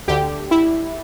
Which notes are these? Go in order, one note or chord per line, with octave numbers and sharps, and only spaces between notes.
D2 D3 G4
E4